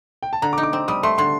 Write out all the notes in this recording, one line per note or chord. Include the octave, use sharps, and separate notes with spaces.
G5
A5
D3 A#5
D6
D#4
D6
C4
G3 D#6
A3 C6
D3 C6